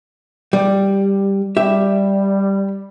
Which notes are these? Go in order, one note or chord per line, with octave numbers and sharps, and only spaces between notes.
G3
G3 G4 E5